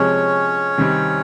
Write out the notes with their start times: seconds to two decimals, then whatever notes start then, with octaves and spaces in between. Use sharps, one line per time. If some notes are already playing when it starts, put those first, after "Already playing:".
Already playing: C3 F3 G#3 C#4 C#5
0.77 C3 D#3 G3 C4